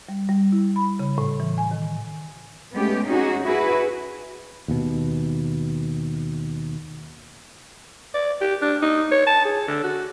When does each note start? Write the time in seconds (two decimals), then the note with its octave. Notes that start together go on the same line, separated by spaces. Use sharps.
0.09 G3
0.29 G3
0.52 E4
0.76 B5
0.99 C#3
1.18 A2
1.40 E3
1.58 G#5
1.71 D#3
2.73 G#3 A3 B3 C#4 G4
3.06 C#4 D#4 F#4 G#4
3.45 E4 F#4 G#4 B4
4.68 D#2 B2
8.14 D5
8.41 G4
8.61 D4
8.82 D#4
9.11 C#5
9.26 A5
9.45 G#4
9.68 D3
9.84 F#4